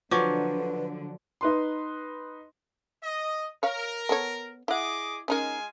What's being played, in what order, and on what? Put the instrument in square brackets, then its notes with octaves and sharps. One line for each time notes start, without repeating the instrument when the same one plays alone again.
[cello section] D3 [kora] F3 F#3 [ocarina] B4 [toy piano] C#6 D6
[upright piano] D#4 B4 C6
[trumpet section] D#5
[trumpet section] A#4 [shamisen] C#5 F5
[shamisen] B3 A4 C#5
[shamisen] E4 F#5 [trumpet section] G#4 D#5 D6
[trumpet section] G#3 F4 G#5 [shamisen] C#4 D#4 A#4